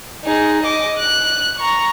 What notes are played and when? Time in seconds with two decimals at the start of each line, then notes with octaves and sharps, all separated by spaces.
0.25 D#4 G#4
0.64 D#5 D6
0.98 F#6
1.60 A#5 C#6